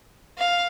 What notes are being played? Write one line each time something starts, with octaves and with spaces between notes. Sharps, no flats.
F5